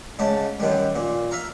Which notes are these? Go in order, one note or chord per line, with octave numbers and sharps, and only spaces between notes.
G#2 C#3 A5
F#2 D#3 G3
A#2
E5 F5 A#5